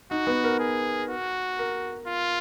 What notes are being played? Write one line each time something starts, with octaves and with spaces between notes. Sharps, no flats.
D#4 F#4
B3
A#4
G#4
F#4
A#4
F4